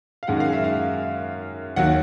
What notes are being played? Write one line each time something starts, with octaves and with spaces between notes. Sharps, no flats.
F5
F#2 D#3 G#3 F#5
F5
E5
F5
D#2 D#3 F#3 F#5